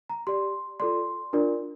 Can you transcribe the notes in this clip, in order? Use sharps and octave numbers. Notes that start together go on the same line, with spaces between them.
A#5
G4 D5 C6
F4 A4 D5 C6
D4 F4 A#4 D5